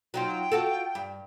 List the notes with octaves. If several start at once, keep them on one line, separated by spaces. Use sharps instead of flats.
F#3 D#4 F4 G5
F4 F#4 A4
G2